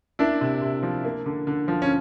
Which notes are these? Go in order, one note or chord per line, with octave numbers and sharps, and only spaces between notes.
A#3 D4 E4
C3
C3
F3
A#3
D3
D3
F3
C#4